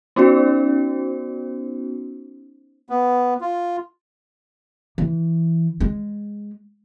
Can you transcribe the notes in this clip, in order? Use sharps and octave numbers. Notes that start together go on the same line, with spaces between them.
B3 C#4 D#4 F#4 C5
B3
F4
E3
G#3